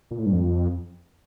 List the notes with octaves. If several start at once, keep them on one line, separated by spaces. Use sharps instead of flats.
A#2
A2
G2
F2